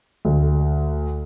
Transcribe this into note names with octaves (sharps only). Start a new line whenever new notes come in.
D2